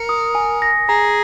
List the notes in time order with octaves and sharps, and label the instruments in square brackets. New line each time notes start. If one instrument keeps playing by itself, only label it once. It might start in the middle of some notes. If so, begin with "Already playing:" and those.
Already playing: [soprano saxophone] A#4 [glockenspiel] C#7
[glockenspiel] D#6
G#5
A#6
[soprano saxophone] G#4 [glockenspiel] A#5